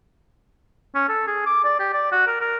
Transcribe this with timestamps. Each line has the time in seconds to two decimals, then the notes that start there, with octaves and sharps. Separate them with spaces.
0.95 C#4
1.09 A4
1.27 G#4
1.46 D6
1.65 D5
1.80 G4
1.94 D5
2.12 F#4
2.27 A#4
2.41 A#4